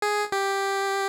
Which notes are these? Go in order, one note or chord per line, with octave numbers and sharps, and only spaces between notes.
G#4
G4